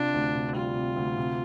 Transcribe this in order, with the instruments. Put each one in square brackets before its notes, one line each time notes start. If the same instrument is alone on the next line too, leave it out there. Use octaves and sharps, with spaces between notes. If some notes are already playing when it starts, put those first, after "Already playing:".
Already playing: [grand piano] C3 F4 [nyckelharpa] D4
[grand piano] D2
C3
[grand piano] G3 [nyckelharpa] F4
[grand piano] C3
D2
C3